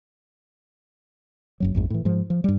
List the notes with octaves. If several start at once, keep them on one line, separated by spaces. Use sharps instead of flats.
F#1 F#2 F#3
A1 F2 G#2
A2 E3
G#2 F3
F3
G2 G3